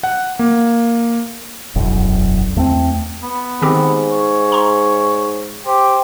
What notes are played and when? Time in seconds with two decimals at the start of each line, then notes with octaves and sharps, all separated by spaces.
0.03 F#5
0.39 A#3
1.76 E1 B1 F#2
2.56 E2 A3 B3 C4
3.22 B3
3.62 G#2 D#3 C4 G4
4.11 C#5
4.52 A#5 C6
5.66 G4 C5